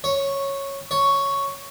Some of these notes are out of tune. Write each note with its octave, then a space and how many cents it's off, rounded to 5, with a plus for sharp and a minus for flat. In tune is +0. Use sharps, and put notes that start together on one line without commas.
C#5 -5
C#5 +5